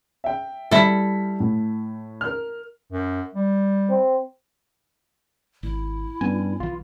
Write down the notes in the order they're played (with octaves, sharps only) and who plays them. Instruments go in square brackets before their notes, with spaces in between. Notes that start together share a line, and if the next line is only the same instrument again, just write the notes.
[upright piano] E5 G5
[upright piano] G3 B6 [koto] E4 A4
[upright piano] A2
A#4 F6
[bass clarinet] F#2
G3
[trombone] C4
[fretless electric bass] G#1 [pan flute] E4
[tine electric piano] G2 G#5 [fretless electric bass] B3 C#4
[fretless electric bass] B1 E3 [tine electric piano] F4